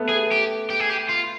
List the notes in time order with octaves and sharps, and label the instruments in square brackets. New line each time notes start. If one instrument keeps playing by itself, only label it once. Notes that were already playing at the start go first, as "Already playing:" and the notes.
Already playing: [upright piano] A3 B3
[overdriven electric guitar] G#4
G4
G4
G#4
G4
F4